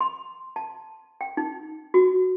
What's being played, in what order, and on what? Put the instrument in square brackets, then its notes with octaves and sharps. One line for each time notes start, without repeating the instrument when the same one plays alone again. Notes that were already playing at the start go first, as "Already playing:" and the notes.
[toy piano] C6
A5
G5
D#4
F#4